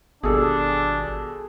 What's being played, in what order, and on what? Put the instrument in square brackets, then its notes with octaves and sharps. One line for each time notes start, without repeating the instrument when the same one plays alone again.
[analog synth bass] G#1 [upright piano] B2 G3 [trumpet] D4 [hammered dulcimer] G#4 A4